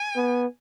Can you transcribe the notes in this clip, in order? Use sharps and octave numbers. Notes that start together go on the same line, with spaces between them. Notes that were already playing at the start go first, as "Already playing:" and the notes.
Already playing: G#5
B3